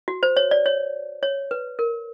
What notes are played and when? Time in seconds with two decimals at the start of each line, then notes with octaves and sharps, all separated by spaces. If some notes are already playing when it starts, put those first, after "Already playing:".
0.08 F#4
0.23 C5
0.37 C#5
0.51 D5
0.66 C#5
1.23 C#5
1.51 B4
1.79 A#4